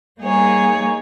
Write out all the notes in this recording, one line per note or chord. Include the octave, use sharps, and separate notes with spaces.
G3 A#3 D#4 G#4 C#5